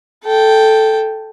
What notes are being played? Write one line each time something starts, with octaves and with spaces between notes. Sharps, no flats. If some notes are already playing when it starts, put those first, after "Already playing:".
A4 G5